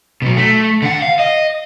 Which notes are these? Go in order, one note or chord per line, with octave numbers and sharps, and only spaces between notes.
B2 F#3
A3
D3 F#5
F5
D#5